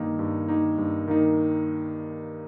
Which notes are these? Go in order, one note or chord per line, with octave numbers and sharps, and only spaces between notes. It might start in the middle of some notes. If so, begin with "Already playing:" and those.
Already playing: G2 D#3 A#3 D#4
G2
D#3 A#3 D#4
G2
D#3 A#3 D#4